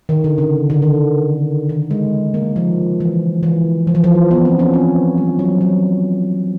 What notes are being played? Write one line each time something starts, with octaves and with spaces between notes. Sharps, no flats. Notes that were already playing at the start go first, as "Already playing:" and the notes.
D#3
D3
C#3
D3
D#3
D#3
G#3
A#3
F3
E3
E3
F3
E3
F3
B3
C4
C#4
C4
G3
F#3
F#3